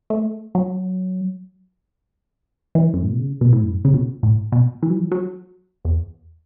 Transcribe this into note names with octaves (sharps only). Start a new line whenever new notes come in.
A3
F#3
E3
F#2
A2
B2
C#3
B2
A2
F#2
C#3
B2
A2
B2
E3
F#3
E3
F#3
E2